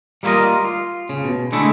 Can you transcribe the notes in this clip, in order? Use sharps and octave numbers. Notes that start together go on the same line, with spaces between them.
G3 A#3 E4 F4 A#4 D#5
F4
C#3
B2
D3 G#3 A3 E4